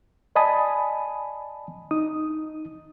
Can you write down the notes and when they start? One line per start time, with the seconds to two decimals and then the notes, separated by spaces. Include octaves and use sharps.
0.35 D5 D#5 G#5 A5 B5 D#6
1.91 D#4 D#6